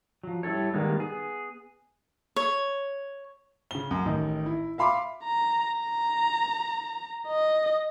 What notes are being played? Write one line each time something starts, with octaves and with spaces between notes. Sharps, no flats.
F3 F#3
G3 E4 F#4 A4 C#5
D#3 G3 G#3 A#3 B3
B3 G#4
C#5
C#3 G7
F#2
A1 D#3
E4
E5 F5 B5 C6 D6
A#5
A#5
D#5